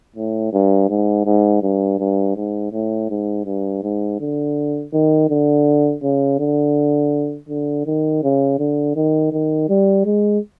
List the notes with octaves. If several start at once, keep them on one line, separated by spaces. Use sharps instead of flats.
A2
G2
G#2
G#2
G2
G2
G#2
A2
G#2
G2
G#2
D3
D#3
D3
C#3
D3
D3
D#3
C#3
D3
D#3
D#3
G3
G#3